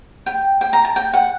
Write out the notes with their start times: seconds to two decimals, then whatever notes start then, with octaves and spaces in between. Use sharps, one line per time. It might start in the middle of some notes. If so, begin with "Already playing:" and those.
0.26 G5
0.61 G5
0.73 A#5
0.85 A5
0.96 G5
1.13 F#5